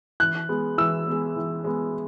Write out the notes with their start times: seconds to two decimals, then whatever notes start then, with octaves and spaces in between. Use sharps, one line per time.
0.20 E3 F#6
0.49 G#3 B3
0.78 E3 E6
1.07 G#3 B3
1.36 E3
1.64 G#3 B3